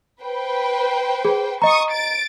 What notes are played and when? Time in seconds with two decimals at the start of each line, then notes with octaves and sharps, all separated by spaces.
0.21 B4 C5 G5
1.25 G#4
1.62 D#5 A#5 C#6 D#6
1.91 A6 D7